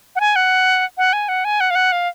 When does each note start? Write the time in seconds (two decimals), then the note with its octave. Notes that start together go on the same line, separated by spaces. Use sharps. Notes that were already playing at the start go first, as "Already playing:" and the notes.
0.16 F#5
0.20 G#5
0.36 F#5
0.98 F#5
1.13 G#5
1.29 F#5
1.45 G#5
1.60 F#5
1.70 F5
1.75 F#5
1.92 F5